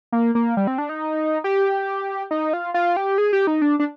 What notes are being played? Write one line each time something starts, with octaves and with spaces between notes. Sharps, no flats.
A#3
A#3
G3
C4
D4
D#4
G4
D#4
F4
F4
G4
G#4
G4
D#4
D4
D4